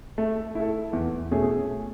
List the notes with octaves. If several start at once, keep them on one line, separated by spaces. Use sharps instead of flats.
A3
E4 A4
E2
B2 A3 C#4 G#4